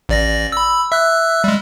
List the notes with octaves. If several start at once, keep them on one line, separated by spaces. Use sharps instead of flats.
A1 D5 A#6
B5 E6
E5 E6 F#6
G3 G#3